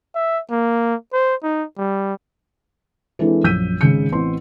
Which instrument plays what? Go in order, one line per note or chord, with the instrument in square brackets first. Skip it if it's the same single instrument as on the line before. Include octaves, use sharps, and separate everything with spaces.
[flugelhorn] E5
A#3
C5
D#4
G3
[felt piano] E3 G#3 C4 D4 A4
A#1 F#2 E6 G6 B6 D#7
G#1 C#3 G#3 G6 C#7
A1 B3 C4 C6